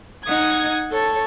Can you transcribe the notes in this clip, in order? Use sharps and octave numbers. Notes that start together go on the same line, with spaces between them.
D#4 F#5 D#6 G#6
A4 C#5 A5